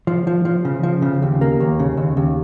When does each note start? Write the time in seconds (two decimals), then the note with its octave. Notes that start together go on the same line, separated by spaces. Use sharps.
0.07 F3
0.27 F3
0.45 F3
0.65 C#3
0.83 F3
1.02 C#3
1.22 D#2
1.41 A#3
1.60 D#2
1.79 C#3
1.97 D#2
2.17 D#2